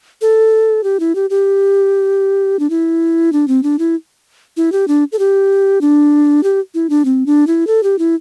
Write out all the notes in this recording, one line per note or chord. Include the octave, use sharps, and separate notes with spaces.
A4
G4
E4
G4
G4
D4
E4
D4
C4
D4
E4
E4
G4
D4
A4
G4
D4
G4
E4
D4
C4
D4
E4
A4
G4
E4